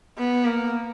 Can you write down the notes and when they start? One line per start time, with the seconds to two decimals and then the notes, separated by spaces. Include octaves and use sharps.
0.18 B3
0.45 A#3